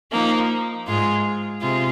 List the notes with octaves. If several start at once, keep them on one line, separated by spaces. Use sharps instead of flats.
F3 A#3 D#4
G#2 G#3 F4 G#4
C3 F4 G#4